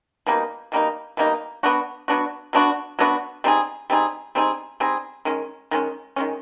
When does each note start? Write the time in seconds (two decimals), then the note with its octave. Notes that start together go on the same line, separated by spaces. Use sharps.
0.27 B2 G3 A#3 D#4
0.72 B2 G3 A#3 D#4
1.17 B2 G3 A#3 D#4
1.63 F#3 B3 D4 F#4
2.08 F#3 B3 D4 F#4
2.53 F#3 B3 D4 F#4
2.99 F#3 B3 D4 F#4
3.44 G3 C4 D#4 G#4
3.90 G3 C4 D#4 G#4
4.35 G3 C4 D#4 G#4
4.80 G3 C4 D#4 G#4
5.25 D#3 G#3 C#4
5.71 D#3 G#3 C#4
6.16 D#3 G#3 C#4